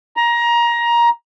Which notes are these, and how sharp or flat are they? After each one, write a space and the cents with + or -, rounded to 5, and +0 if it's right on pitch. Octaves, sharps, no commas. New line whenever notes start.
A#5 +20